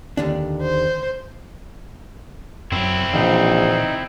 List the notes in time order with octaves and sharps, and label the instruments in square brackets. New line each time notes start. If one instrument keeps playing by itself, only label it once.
[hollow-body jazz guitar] D#2 D3 D4
[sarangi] C5
[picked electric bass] F#2 F#3 [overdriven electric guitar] C4 E4
[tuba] A#1 [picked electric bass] A#2 E3 F3 [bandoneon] D#4